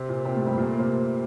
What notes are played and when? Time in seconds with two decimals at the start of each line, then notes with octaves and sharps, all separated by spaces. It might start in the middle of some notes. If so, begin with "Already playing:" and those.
Already playing: C3 C4
0.09 A#2 A#3
0.25 C3 C4
0.36 A2 A3
0.46 G2 G3
0.57 A#2 A#3
0.65 A3
0.72 A#3
0.79 C3 C4